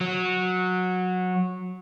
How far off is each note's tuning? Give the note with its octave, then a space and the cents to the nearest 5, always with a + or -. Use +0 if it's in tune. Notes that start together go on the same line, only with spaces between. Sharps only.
F#3 -15